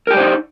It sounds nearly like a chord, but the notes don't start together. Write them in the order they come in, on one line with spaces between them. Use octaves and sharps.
A#4 G4 D5 C5 D#4